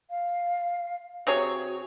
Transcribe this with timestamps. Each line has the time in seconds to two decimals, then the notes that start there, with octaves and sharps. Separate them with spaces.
0.10 F5
1.27 C3 F#4 G#4 C#5